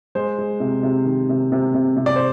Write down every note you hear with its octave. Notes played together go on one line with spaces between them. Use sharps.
G#3 C5
G#3
C3
C3
D#3
C3
C3
C3
C3
D5
C5